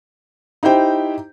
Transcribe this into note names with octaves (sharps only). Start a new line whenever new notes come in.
D#4 E4 G4 C5 G5